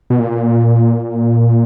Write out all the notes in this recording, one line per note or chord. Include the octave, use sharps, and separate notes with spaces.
B2
A#2